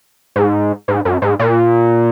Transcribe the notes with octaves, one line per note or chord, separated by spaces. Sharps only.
G#2
G#2
F#2
G#2
A#2